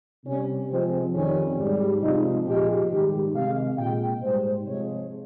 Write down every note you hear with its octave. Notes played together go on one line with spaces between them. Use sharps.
C3 G3 C#4
C3 F3 G#3 C4
F2 D#3 G3 C#4
G#2 G3
C3 F3 G#3 D#4
A#2 F3 G#3 G4
G#2 D#3 G3 G4
C3 D#3 G#3 F5
A#2 G#3 G5
G#2 G3 C5
C3 F3 G#3 C#5